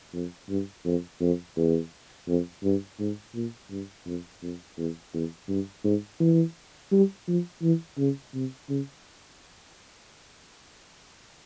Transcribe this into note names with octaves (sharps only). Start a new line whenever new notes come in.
F2
G2
F2
F2
E2
F2
G2
G#2
A#2
G2
F2
F2
E2
E2
G2
G#2
E3
G3
F3
E3
C#3
C3
C#3